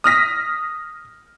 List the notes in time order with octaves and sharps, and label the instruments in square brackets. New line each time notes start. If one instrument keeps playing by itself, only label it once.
[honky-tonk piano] D#6 F6 A#6 B6